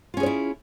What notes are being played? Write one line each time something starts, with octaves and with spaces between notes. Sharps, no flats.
C#4 E4 F4 G#4 C#5